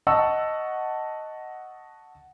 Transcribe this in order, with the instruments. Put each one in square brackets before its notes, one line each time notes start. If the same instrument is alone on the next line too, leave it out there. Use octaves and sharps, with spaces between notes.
[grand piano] D#5 F#5 A5 C#6 E6